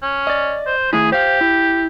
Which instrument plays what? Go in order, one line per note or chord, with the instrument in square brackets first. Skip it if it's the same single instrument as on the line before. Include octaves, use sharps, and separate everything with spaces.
[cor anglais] C#4
[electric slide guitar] D5 D#5
[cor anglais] C5
[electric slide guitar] D#3 A3 E4 [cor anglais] G#4
[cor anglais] G4 [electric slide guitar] C5 F5
[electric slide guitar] E4